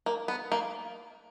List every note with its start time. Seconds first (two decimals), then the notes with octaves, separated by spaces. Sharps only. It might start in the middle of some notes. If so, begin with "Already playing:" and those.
0.06 A#3
0.28 B3
0.52 A#3